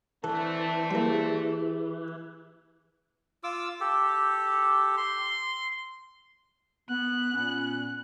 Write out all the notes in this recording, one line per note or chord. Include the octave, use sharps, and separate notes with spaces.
D3 E3 A3 C4 A4
G3 A#3 E4 G4 G#4
F4 D6 E6
G4 A4
C6
B3 F#6
A#2 B3 C#4